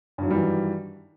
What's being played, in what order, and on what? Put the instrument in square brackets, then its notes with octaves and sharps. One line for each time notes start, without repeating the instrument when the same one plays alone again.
[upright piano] G2
F#3
D#3
G3
E3